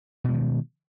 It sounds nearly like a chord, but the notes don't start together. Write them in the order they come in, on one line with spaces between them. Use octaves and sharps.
B2 G#3 D#3